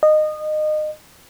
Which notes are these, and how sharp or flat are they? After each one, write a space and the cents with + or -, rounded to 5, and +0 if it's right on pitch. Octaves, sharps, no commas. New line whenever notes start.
D#5 -25